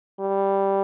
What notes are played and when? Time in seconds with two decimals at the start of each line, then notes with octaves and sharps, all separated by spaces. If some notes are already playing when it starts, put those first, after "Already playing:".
0.20 G3